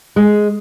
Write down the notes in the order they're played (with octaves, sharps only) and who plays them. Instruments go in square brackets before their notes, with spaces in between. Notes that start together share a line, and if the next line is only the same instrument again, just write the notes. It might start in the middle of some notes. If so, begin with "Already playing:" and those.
[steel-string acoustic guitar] G#3